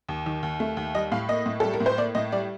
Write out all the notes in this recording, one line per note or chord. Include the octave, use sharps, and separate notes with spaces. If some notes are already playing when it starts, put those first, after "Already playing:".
D#2
D#3
D#2
A3
D#2
G3 D#5
A2 F5
A#3 D#5
A2
G3 A4
A#4
A2
C5
A#3 D5
A2 D#5
G3 D5